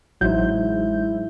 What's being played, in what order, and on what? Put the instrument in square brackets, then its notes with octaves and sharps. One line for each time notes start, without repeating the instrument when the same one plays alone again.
[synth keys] A1 G6 [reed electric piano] F#3 D#4 C5 [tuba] G#3 [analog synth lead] E4